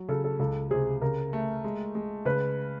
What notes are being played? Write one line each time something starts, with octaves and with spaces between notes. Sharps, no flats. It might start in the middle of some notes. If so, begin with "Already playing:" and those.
Already playing: F#3
C#3 A4
A4
C#2 A4
C3 G#4
C#3 A#4
A3
G#3
G#3
C#3 B4